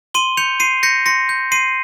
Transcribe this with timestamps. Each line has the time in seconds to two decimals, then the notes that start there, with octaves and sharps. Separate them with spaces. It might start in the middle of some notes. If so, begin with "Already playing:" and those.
0.14 C6 D#7 G7
0.37 G6 C#7 F7
0.60 C6 C7 D#7
0.83 G6 A#6 C#7
1.06 C6 A#6 C#7
1.29 G6
1.52 C6 C7 D#7